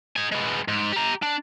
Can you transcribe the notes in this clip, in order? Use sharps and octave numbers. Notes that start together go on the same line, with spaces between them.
D#4 G#5
G#3 B3
G#2
G4 A#5
D4